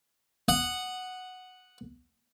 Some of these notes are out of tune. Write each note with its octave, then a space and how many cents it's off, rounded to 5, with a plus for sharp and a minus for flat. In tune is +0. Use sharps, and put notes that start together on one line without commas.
F#5 +0 D#6 -15